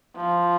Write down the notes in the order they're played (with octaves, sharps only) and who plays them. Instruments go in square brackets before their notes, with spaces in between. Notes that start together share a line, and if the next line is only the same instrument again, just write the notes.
[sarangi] F3